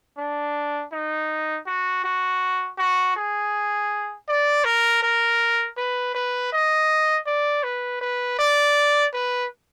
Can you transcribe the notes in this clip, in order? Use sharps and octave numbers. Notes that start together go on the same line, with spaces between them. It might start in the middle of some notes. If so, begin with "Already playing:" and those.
D4
D#4
F#4
F#4
F#4
G#4
D5
A#4
A#4
B4
B4
D#5
D5
B4
B4
D5
B4